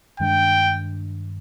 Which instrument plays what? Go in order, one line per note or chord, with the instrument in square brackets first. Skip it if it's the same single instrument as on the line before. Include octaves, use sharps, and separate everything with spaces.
[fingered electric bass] G2 D#3 G#3 D4 [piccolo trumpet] G5